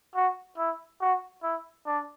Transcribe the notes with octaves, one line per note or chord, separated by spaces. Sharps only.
F#4
E4
F#4
E4
D4